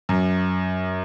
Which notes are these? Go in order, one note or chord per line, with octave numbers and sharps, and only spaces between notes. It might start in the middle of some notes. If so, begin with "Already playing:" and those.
F#2